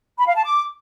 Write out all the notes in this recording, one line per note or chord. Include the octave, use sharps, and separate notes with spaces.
B5
F5
A5
D6